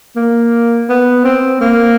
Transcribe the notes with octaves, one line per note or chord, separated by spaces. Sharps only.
A#3
B3
C4
A#3